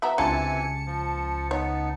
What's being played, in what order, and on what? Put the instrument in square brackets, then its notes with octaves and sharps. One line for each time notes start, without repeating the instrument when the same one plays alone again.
[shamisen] B3 F#4 A#5 [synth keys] E5
[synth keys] C#2 A5 C#7 [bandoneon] C3 E3 G#5 [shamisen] D4 F4
[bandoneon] F3
[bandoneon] B3 D#4 [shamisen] C#5